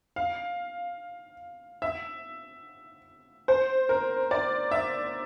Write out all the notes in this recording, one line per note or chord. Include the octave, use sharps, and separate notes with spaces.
F5
E5
C5
A#4
D5
E5